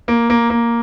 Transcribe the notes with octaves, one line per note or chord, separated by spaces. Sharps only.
A#3
A#3
A#3